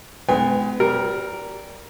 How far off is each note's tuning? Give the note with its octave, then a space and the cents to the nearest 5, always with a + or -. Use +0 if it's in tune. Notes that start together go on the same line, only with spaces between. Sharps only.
G#3 +30 B3 +35 G#5 -40
G3 -15 A#4 +0